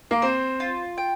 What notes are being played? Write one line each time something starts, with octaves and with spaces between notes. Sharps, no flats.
A#3
C4 C5
F4
G5